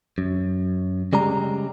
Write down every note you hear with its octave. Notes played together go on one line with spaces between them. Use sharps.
F#2
C#3 G3 G#3 A#5